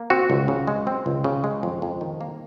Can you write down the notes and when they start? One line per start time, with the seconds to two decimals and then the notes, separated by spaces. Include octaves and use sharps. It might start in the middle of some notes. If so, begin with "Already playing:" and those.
Already playing: A#3
0.10 C4 F#4
0.30 C#2
0.48 C#3
0.67 G#3
0.87 C4
1.06 C#2
1.24 C#3
1.44 G#3
1.63 F2
1.82 F2
2.01 D#3
2.21 A#3